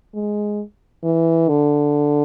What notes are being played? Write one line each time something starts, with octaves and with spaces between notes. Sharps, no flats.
G#3
E3
D3